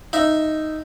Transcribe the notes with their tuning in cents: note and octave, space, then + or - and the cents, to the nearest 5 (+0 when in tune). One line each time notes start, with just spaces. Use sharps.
D#4 +0 E5 +0